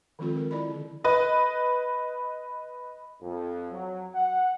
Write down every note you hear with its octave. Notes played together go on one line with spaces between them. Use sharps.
D#3 F3 G#3 C4 F4 A4
A#4
E4 D5 D#5 B5
D3
B4 D#5
F2
F#3
F#5